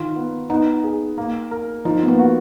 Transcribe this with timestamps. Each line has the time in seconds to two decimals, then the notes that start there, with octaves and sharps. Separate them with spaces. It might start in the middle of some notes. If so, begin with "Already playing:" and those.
Already playing: D#3 F4
0.16 B3
0.49 B3 D#4
0.84 G#4
1.18 A#3
1.51 A#4
1.85 F3 D#4
2.03 B3
2.08 A#3
2.19 F#4